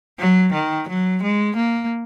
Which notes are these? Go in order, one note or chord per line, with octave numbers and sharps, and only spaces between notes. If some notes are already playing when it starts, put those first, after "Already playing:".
F#3
D#3
F#3
G#3
A#3